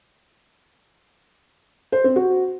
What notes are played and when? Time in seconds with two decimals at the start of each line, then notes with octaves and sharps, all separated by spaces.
1.92 C5
2.04 C4
2.16 F#4